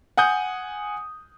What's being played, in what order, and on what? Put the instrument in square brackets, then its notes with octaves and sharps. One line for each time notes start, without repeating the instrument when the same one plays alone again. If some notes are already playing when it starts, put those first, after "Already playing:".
[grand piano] F#5 G#5 D#6 G6